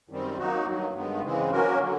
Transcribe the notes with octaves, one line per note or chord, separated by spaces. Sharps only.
F#2 D#3 G3 C4
F#3 A#3 D#4 F#4
G2 D#3 F#3
G2 D#3 G#3 B3
C#3 E3 G#3 C4
F#3 A#3 C#4 F#4 A#4
D3 F#3